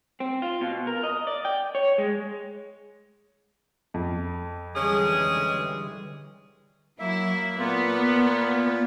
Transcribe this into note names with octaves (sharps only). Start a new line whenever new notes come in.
C4
F4
B2
A#4
D#5
D5
G5
C#5
G#3
F2
D3 E3 G3 G#3 C#4 G#4
F#3 A#3 E4 E5
A#2 A#3 B3 F4